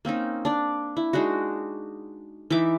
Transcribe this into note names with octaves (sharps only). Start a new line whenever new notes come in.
A#3 C4 C#4 D#4
D4 D5
E4
G#3 D4 D#4 F#4
E3 D#4 E5 D6